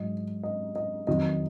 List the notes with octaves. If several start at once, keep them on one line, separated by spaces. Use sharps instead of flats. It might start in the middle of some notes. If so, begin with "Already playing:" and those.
Already playing: G#2 F#3 D#5
D#5
D#5
F2 D#3 F#3 D#5